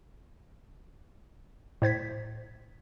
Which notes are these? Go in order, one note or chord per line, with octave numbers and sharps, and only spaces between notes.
A2 C5 G#6 B6